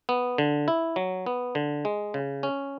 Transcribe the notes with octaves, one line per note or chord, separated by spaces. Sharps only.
B3
D3
E4
F#3
B3
D3
G#3
C#3
C#4